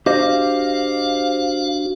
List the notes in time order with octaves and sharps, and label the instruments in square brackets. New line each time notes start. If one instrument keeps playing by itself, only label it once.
[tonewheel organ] D4 F#4 [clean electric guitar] G4 C5 D#5 [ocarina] F5